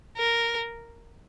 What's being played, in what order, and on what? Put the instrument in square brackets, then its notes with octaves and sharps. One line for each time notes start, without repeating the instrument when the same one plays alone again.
[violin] A#4